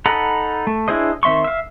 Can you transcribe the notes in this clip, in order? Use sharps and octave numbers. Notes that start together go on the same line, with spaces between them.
D#4 A4 F#5 A#5 B5
A3
D4 E4 G#4 C5 D#5
D#3 C4 E5 C6 C#6
E5 F5